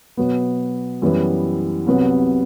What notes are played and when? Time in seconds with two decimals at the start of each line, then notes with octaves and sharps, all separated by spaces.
0.17 B2 F#3 B3
1.02 F#2 E3 G3 B3
1.87 C2 C3 F#3 B3